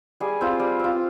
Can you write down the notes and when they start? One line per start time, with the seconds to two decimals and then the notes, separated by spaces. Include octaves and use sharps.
0.20 G3 G#4 G#5
0.41 C4 F4
0.60 G3
0.79 C4 F4